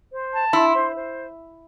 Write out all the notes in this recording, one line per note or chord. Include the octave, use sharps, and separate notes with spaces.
C5
A5
E4 C6
C5
C5